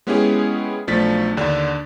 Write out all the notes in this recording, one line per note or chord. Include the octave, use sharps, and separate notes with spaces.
G#3 B3 C#4 E4 G4 G#4
B1 F3 A3 D4 A6 B6
D#2 D3 D4